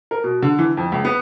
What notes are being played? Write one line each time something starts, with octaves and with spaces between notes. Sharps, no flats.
A#4
B2
D3
E3
F2
C#2
B3